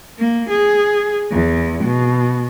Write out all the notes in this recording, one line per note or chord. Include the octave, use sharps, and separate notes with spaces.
A#3
G#4
E2
B2